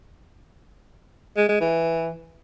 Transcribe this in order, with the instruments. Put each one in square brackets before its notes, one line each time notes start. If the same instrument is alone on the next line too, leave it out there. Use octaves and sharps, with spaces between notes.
[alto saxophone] G#3
G#3
E3